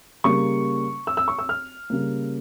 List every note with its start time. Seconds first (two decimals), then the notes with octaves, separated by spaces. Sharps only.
0.24 C#3 G3 A#3 C#6
1.07 E6
1.17 E6
1.28 C#6
1.39 E6
1.49 F6
1.90 C#3 G3 A#3